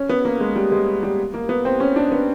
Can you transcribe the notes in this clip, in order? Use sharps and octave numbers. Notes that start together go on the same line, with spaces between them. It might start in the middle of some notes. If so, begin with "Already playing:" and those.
Already playing: C#4
B3
A#3
G#3
G3
G#3
G3
A#3
B3
C4
C#4
D4
B3